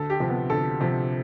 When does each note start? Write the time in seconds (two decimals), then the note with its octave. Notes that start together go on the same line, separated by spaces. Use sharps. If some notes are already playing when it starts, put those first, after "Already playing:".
Already playing: D2 A4
0.10 G4
0.20 C3 F3
0.30 B3
0.50 D2 A4
0.80 C3 F3